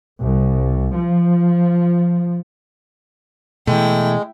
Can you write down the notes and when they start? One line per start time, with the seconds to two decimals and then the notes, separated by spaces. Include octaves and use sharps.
0.21 C2
0.96 F3
3.67 B2 E3 G#3 A3 E4 G5